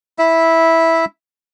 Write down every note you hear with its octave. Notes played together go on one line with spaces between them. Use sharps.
E4 E5